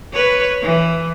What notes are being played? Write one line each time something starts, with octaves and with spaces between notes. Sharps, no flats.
B4 C#5
E3